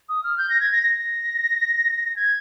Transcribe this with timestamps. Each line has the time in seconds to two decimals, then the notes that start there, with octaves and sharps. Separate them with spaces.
0.09 D#6
0.24 F6
0.38 G6
0.50 A#6
0.60 G#6
0.72 A#6
0.83 A#6
2.16 G#6